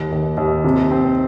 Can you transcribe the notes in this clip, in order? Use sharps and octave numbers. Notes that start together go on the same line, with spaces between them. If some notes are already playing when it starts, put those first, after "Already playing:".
Already playing: D#2
D#2
D#2
C3
C4